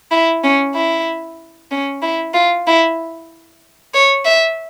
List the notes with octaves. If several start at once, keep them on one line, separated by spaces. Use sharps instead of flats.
E4
C#4
E4
C#4
E4
F4
E4
C#5
E5